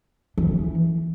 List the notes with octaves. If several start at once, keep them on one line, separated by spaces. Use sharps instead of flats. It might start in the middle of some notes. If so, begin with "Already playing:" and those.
E3